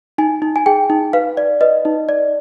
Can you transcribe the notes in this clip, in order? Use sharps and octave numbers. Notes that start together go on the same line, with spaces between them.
D#4 G#5
D#4
G#5
G#4 G5
D#4
B4 F5
D5
B4 D#5
D#4
D5